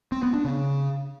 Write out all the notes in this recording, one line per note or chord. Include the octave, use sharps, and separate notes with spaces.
C4
B3
D4
C#3